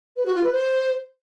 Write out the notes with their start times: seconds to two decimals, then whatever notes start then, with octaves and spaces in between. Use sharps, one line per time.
0.16 B4
0.25 F#4
0.34 F4
0.43 B4
0.52 C5